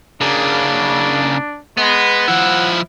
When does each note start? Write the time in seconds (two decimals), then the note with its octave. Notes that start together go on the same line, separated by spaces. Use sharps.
0.21 C#3 A#3 D4
1.78 G#3 B3
2.28 F3 E4 F#5